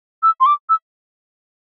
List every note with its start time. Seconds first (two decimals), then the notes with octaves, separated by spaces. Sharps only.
0.23 E6
0.40 C6
0.46 D6
0.69 E6